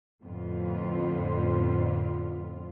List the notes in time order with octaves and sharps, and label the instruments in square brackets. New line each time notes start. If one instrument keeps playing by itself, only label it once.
[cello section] F2 A2 D3 B3 F4